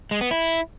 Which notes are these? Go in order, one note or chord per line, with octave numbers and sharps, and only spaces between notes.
G#3
B3
E4